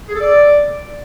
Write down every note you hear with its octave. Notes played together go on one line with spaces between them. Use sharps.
G#4
A4
D5